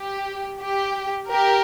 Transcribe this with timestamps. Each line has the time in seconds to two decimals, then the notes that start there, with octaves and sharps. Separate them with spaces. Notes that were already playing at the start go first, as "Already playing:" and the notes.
Already playing: G4
0.62 G4
1.30 G4 A#4